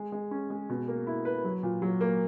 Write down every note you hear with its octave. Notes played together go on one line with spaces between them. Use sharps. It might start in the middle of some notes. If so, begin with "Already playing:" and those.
Already playing: G#3
G#3
C#4
G#3
B2
A#3
E4
B4
F#3
A#2
F#3
A#3